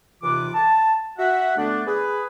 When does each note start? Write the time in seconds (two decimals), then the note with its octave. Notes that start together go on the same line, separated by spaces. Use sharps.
0.23 D#2 C3 E3 F4 B4 D6
0.54 A5
1.18 F#4 E5 F#5
1.57 D3 A3 B3 D4
1.86 G#4 B4